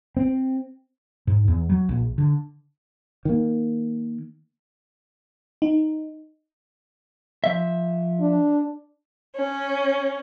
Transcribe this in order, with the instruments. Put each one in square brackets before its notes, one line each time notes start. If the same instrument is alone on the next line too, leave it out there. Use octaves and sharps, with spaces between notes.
[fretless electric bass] C4
G#2
E2
F#3
A#1
D3
D#3 A#3
[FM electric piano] D#4
[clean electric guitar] F3 E5
[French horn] D4
[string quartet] C#4